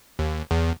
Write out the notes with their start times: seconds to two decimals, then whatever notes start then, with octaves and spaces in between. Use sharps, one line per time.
0.19 D#2
0.51 E2